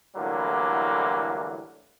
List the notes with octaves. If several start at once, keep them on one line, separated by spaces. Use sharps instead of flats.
A2 D3 E3 F#3 G3 A#3